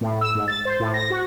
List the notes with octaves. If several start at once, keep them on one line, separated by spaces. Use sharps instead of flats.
A2
E6
G#2
A6
C5
A2
A#6
F#4